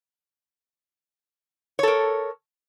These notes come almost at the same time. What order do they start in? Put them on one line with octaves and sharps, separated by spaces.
C#5 A4 A#4